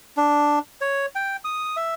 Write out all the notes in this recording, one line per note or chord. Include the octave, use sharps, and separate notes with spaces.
D4
C#5
G5
D#6
E5